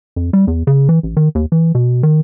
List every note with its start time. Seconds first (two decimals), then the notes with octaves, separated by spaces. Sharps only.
0.16 F2
0.33 G3
0.47 E2
0.67 C#3
0.89 E3
1.03 A1
1.17 D#3
1.35 D#2
1.52 E3
1.75 B2
2.03 D#3